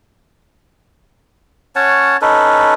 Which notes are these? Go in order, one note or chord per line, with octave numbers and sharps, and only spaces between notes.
C#4 C#5 F#5 A5
C#4 D#4 A4 B4